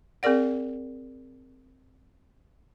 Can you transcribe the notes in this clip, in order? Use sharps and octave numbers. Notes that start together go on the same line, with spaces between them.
C4 G#4 A#4 D5 F#5